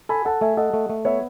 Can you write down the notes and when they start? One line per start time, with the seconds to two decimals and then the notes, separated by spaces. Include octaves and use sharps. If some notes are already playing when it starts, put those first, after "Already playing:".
0.09 A4 G#5 B5
0.25 A4 F#5 A5
0.41 A3 E5 G#5
0.57 A4 D#5 F#5
0.73 A3
0.89 A3
1.05 B3 C#5 E5